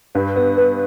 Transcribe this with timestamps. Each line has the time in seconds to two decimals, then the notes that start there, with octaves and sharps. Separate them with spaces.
0.15 G2 B4
0.36 B3
0.57 B3